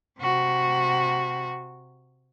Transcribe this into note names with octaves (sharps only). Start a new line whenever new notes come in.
C3 F#4